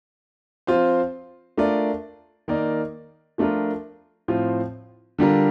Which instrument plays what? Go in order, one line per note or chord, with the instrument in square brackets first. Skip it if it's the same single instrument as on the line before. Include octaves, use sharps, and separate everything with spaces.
[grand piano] F3 C4 F4 C5
A3 D4 F4 A#4 D5
D#3 A#3 D#4 A#4 D5
F3 A3 D4 F4 A#4
A2 F3 C4 F4
D3 G3 D4 F4 A#4